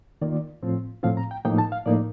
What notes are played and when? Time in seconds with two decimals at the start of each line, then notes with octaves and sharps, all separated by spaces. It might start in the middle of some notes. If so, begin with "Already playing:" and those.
0.22 D#3 A#3 F4 D5
0.63 A2 F3 C4 F4
1.03 A2 F3 C4 F4 F5
1.17 A#5
1.31 G5
1.45 A2 F3 A#3 D#4 G5
1.58 A5
1.72 F5
1.86 A2 F3 A#3 D#4 D5